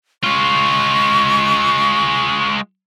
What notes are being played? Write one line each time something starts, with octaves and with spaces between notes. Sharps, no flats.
G#3 F4 C#6